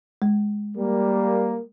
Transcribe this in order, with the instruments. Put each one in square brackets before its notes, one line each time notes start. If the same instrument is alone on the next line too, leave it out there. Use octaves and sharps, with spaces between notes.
[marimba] G#3
[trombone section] G3 A#3